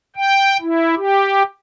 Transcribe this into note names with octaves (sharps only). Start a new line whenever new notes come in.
G5
E4
G4